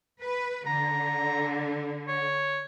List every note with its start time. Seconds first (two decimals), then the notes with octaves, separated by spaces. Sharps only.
0.21 B4
0.67 D3 A#5
2.08 C#5